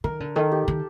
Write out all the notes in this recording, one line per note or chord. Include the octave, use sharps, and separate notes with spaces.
D#3 A#4
D3
D#3 A4
G4
D#3